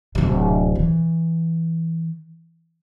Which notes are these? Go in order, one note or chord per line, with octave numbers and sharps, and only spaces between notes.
D1 C3
E3